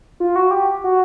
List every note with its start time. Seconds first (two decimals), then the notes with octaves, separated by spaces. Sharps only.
0.20 F4
0.36 F#4
0.51 G4
0.84 F#4